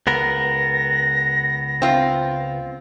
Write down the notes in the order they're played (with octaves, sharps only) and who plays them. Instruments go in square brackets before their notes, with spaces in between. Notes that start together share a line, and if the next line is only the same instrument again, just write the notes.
[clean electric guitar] C#2 B3 A#4 [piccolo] A#6
[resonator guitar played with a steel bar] C4 F4